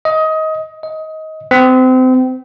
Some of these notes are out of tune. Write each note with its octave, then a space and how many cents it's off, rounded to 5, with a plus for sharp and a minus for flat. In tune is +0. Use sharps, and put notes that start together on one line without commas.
D#5 +20
D#5 +20
C4 -30